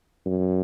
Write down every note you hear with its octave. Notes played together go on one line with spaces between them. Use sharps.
F#2